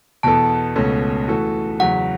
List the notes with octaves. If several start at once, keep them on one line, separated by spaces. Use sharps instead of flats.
E2 B2 B3 A4 A5
C#2 B2 A3 C#4 A4
E3 A3 F#4 A4
E2 C#3 F#3 F#5